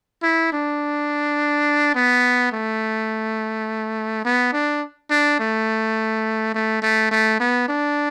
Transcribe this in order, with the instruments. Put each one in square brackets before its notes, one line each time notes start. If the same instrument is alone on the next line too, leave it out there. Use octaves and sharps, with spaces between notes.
[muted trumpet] E4
D4
B3
A3
B3
D4
D4
A3
A3
A3
A3
B3
D4